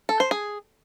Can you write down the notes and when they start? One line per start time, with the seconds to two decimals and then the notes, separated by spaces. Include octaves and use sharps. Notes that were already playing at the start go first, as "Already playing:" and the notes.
0.09 A4
0.20 C5
0.31 G#4